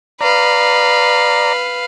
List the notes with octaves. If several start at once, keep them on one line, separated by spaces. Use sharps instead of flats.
B4 D5 F5 A#5